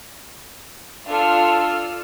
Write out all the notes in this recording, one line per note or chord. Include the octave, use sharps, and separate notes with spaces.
D4 F4 A4 E6 F6